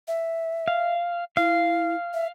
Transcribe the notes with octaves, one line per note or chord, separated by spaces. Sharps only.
E5
F5
E4 F5
E5